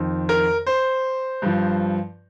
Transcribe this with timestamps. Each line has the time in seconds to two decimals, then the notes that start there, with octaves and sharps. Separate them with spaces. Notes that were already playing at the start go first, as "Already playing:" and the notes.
Already playing: F2 D#3
0.29 A#4
0.67 C5
1.42 G2 F3